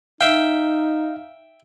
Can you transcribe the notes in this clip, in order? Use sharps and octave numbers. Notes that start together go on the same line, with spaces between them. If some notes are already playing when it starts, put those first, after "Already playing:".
D#4 E5 F5 G5